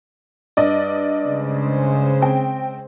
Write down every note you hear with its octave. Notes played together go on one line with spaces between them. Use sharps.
G2 D5 D#5
C#3 G#3 C5
C4 G5